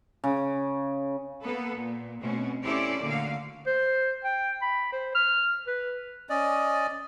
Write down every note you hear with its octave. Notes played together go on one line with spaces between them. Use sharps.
C#3
A#3 B3 A4 B4
A#2
B2 A3 C4 C#4
C#4 E4 G4 A4 C5 D5
D2 A#2 D3 A#3 F#4 F5
C5
G5
B5
C5
F6
B4
C#4 D5 D#5